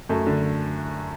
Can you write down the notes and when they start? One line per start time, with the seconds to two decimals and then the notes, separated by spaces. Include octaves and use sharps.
0.09 F#2 A3
0.26 D3